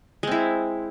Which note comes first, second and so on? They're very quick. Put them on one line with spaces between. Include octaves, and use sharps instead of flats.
G#3 C4 E4